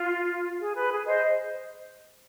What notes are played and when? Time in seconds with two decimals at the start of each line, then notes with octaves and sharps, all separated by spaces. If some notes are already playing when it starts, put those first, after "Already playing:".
Already playing: F4
0.60 G#4
0.76 B4
0.91 G#4
1.07 C5 D#5